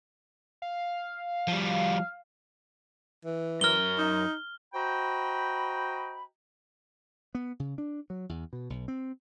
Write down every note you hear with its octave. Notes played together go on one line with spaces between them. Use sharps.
F5
F3 G3
E3
F#2 A#4 F6 G7
D#4
F#4 C5 D#5 G5 A#5 B5
B3
C#3
D4
F#3
E2
B2
B1
C4